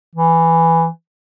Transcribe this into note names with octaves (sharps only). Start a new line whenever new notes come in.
E3